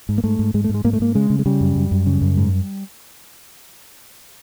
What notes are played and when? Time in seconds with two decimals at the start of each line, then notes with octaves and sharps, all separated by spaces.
0.09 G#2
0.18 A#3
0.24 G#2 A3
0.39 G#2
0.54 G#2 G#3
0.64 A3
0.69 G#2 G#3
0.84 G#2 A#3
0.93 A3
1.00 G#2 A#3
1.15 C#3 G#3
1.30 C#3
1.39 G#3
1.46 C#3 G3
1.61 F#2
1.76 F#2
1.91 F#2
2.06 C#3
2.22 F#2
2.37 G#2